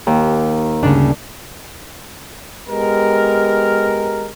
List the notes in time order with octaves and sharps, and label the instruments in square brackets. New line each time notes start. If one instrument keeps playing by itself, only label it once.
[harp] D#2
[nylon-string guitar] D2 G2 C#3 [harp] D4
[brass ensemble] G#3 B3 G4 A#4